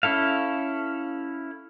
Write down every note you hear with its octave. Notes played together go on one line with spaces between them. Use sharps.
C#4 E4 A4 F5